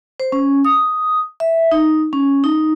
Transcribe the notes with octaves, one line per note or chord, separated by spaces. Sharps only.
C5
C#4
D#6
E5
D#4
C#4
D#4